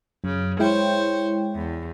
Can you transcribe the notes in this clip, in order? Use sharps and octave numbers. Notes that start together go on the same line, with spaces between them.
F#2 C#3
G#3 E4 C5 C#5 G5
E2